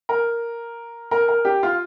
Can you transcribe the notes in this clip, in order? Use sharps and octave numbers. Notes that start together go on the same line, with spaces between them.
A#4
A#4
A#4
G4
F4